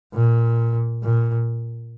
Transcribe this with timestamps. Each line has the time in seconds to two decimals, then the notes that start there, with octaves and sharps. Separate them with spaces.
0.13 A#2
1.03 A#2